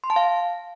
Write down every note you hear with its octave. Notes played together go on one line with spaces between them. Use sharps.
C6
A5
F5